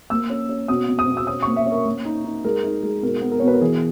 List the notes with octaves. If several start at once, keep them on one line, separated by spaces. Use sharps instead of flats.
A#3 E6
C#4
C#4
B2 D#6
B2
D#6
B2
E6
C#4 D#6
A#3 C#6
E5
C#4
A#4
A#3
D#4
D#4
G#3 A#4
D#4
G#3
B2 A#4
B3
A#4
B2 C#5
B4
A#4
E3 G#4